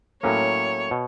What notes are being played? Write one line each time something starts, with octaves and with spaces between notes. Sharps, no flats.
A2 F#3 A#3 C#4 C#5
B2